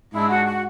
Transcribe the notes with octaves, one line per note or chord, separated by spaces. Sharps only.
G#2 G#3 D4 E4
F#4
F#4